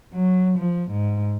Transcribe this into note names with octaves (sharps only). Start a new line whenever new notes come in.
F#3
F3
G#2